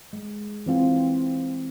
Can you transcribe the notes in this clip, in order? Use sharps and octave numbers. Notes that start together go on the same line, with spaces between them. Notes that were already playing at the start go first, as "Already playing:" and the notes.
G#3
E3 C4 F4